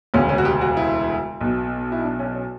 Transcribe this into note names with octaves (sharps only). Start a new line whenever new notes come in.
E1 D2 C#3 C#4
C#4
F#4
G4
F#4
E4
B1 B2
E4
D4
C#4
C#4